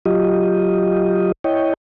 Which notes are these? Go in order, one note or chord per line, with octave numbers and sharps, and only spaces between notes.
F#3 F4 G4 D#5
E4 C#5 D#5 G5